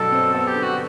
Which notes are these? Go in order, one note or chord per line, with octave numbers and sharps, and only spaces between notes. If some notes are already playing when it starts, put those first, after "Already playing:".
Already playing: G2 B2 F#3 A3 A4
C4
B3 A4
G4
D3
F#4